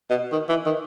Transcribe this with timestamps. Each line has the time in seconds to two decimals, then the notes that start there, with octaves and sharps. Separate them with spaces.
0.10 B2
0.32 D#3
0.49 E3
0.66 D#3